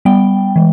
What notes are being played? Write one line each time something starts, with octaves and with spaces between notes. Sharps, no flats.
G3 B3 G5
E3 G#3